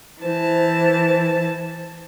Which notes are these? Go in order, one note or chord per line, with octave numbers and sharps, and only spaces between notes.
E3 C5 A5